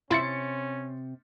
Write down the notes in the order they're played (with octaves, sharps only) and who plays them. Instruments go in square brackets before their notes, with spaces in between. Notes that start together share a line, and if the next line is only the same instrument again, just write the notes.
[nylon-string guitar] C3 C4 [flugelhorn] C#4 [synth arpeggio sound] E4 F4 [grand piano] C6 A6 C#7